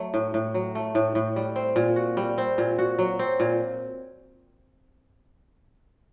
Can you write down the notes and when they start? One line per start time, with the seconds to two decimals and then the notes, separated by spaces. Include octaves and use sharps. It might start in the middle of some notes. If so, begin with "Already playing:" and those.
Already playing: F#3 A3
0.14 A2
0.34 A2
0.54 F#3
0.75 A3
0.95 A2
1.15 A2
1.36 G3
1.56 C4
1.76 A#2
1.96 F#4
2.17 G3
2.38 C4
2.58 A#2
2.78 F#4
2.99 F#3
3.19 C4
3.40 A#2